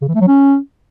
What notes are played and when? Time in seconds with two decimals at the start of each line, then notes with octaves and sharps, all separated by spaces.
0.02 C#3
0.08 E3
0.15 A3
0.21 F#3
0.28 C#4